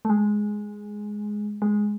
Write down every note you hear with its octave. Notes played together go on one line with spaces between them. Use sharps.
A3
G#3
G#3